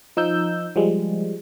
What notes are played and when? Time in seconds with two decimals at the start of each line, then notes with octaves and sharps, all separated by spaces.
0.17 F3 D#4 E6 G6
0.76 F3 G3 G#3